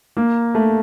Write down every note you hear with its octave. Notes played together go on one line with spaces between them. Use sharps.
A#3
A3